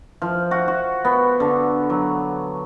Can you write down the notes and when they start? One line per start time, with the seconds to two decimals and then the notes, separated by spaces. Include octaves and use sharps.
0.22 F3
0.51 F#4
0.68 F#4
1.05 B3
1.40 D3
1.90 F#3